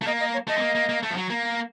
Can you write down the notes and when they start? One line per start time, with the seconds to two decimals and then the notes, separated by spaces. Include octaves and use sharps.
0.02 A3
0.07 A#3 D#5
0.20 D#5
0.34 C#5
0.48 A3 D#5
0.58 C4
0.61 A#3
0.75 A#3
0.89 A#3
1.03 A3
1.10 F3
1.17 F#3
1.30 A#3